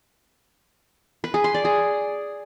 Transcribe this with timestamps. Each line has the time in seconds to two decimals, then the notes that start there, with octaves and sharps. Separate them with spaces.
1.24 B4
1.34 G#4
1.44 C6
1.54 D5
1.65 G#4